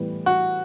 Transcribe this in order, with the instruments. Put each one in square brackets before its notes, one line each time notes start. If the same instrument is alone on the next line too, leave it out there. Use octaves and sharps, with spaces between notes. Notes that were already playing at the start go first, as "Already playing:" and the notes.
Already playing: [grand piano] A2 E3 G3 B3
[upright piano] F#4